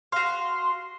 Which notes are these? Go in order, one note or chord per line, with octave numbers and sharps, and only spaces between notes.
F#4 F5 C6